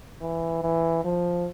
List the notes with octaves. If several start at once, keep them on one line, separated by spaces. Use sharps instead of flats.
E3
E3
F3